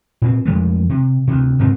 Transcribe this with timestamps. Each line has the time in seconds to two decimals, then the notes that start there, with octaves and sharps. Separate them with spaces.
0.22 A#2 C4
0.45 F2 F3 G#3 A3
0.89 C3
1.27 D2 C3
1.59 D2 G#2 C3 C4